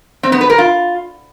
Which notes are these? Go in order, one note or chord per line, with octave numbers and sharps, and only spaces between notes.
C4
B3
B4
A#4
F4